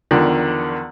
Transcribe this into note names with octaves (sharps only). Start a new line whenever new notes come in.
E2 D3 D#3 F3